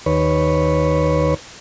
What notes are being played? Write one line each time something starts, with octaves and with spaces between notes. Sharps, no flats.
D#2 B4 C#5